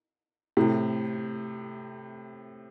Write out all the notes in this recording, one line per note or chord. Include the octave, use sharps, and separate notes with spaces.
A2 C3